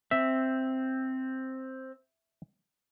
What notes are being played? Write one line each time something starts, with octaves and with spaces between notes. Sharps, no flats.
C4 E5